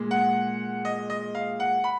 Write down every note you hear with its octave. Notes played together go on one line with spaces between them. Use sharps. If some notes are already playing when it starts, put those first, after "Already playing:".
Already playing: A#2 G#3
F#5
D#5
D#5
F5
F#5
B5